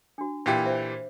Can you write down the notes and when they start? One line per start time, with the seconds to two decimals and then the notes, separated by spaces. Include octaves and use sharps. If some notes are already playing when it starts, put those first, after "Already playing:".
0.18 D4 F#4
0.46 A#2 E3 G4
0.66 C5 E5